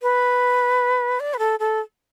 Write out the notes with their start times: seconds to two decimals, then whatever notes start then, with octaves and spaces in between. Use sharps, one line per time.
0.02 B4
1.20 D5
1.34 B4
1.39 A4
1.60 A4